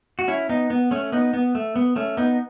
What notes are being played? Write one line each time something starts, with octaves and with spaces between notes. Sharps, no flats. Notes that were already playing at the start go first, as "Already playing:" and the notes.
F#4
C#4 E4
B3 D#4
B3
A3 C#4
B3 D#4
B3
A3
B3
A3 C#4
B3 D#4